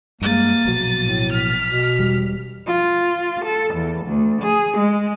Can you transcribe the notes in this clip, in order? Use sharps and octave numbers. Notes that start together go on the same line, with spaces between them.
G2 G#3 A#3 A6 D#7
A#1 B2 F#3
A2
F6 B6
B2
E1 G3
F4
A4
E2
D2
G#4
G#3